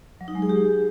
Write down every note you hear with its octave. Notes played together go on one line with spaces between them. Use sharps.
F#3
D#4
G#3
G#4
G4